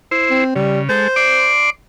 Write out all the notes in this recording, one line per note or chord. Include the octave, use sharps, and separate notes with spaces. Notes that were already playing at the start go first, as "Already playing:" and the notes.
E4 C5
C4
C#3 G3
G#3 A4 C5
D5 C6 D6